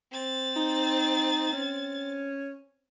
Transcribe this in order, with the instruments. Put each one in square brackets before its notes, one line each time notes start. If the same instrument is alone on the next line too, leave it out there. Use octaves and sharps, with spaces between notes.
[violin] C4 A6
[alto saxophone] D#4
C#4